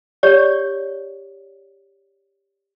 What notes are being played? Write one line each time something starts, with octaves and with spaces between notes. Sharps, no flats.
G4 C#5 D5